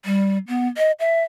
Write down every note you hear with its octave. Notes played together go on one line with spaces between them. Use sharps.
G3
B3
D#5
E5